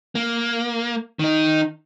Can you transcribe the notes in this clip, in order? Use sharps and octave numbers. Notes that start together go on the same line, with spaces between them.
A#3
D#3 D#4